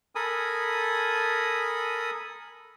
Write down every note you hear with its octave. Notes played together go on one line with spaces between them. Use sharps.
A4 A#4 G#5 B5 D#6